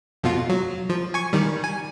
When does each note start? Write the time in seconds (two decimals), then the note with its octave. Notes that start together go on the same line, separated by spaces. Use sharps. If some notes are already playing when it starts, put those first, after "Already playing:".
0.24 F2 B2 F4
0.49 F#3
0.89 F3
1.14 G#5 C#6
1.33 D#3 G3
1.64 G#5